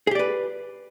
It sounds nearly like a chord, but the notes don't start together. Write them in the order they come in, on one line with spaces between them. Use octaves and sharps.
G#4 G4 D5 B4